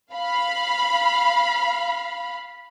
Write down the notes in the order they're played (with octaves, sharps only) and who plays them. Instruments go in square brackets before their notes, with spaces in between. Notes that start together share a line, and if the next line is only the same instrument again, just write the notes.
[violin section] F5 B5